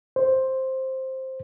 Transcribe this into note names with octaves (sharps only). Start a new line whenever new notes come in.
C5